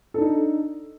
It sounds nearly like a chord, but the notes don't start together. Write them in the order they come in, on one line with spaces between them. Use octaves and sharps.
A4 D4 D#4